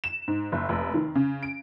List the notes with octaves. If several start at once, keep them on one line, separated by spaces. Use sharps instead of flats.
E7
G#2
F#1
F1
D#3
C#3
D7